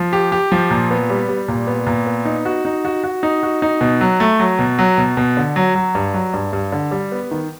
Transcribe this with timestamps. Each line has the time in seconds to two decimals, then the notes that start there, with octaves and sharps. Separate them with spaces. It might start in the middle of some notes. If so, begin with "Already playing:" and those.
Already playing: F3
0.13 G4
0.32 G4
0.52 F3
0.71 A#2
0.91 B3
1.10 G3
1.28 G3
1.48 A#2
1.67 B3
1.87 A#2
2.06 B3
2.25 D#4
2.45 F#4
2.65 D#4
2.85 F#4
3.04 F#4
3.23 D#4
3.43 F#4
3.62 D#4
3.81 B2
4.01 F#3
4.20 A3
4.40 F#3
4.59 B2
4.79 F#3
4.98 B2
5.17 B2
5.37 D3
5.56 F#3
5.75 F#3
5.95 G2
6.14 F#3
6.34 G2
6.53 G2
6.72 D3
6.91 G3
7.12 B3
7.31 D#3